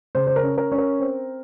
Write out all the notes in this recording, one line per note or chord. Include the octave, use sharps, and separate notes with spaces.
C#3 C5
C5
A#4
C#4
A#4
C#4
A#4
C4